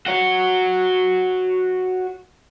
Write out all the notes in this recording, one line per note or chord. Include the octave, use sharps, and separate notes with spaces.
F#4 C#5